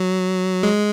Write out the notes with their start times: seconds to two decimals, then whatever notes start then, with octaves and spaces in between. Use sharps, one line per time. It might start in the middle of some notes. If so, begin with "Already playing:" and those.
Already playing: F#3
0.63 G#3